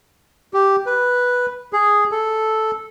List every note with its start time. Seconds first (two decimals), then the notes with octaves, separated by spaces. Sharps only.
0.54 G4
0.86 B4
1.73 G#4
2.11 A4